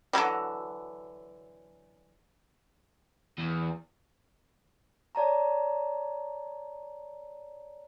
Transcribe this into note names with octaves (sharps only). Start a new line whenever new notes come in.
D3 E3 F#3 G3
E2
C#5 D5 A5 A#5